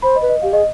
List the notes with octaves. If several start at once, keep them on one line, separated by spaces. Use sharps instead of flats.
C5 B5
D#5
B4
D#5
G4 F5
G#4 D#5